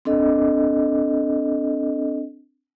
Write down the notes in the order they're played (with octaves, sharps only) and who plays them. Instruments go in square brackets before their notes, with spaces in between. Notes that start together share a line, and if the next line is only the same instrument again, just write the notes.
[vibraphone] C4 D4 A4 D#5